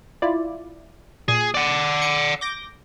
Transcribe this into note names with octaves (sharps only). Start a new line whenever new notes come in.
E4 F4 D5
A#2 G#4
D5 F#5
C#7
D6 G6 A#6